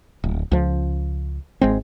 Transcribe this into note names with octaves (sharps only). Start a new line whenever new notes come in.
D1
C#2 F3
G#1 G#3 C4